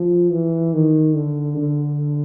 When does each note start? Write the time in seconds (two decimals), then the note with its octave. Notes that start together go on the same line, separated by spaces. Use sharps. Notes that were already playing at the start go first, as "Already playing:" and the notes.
Already playing: F3
0.31 E3
0.74 D#3
1.15 D3
1.57 D3